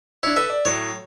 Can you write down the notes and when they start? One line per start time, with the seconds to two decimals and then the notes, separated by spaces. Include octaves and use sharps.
0.23 D4 E4 C#5
0.36 A4 B4 E5
0.50 D5
0.65 A2 F#3 C#5